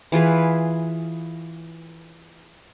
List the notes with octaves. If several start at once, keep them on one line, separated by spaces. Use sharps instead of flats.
E3 F4 G#4 B4